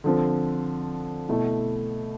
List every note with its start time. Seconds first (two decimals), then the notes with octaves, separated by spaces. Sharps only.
0.04 D3 F3 C4
1.29 B2 A3 E4